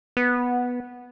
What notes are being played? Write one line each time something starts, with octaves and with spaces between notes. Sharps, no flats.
B3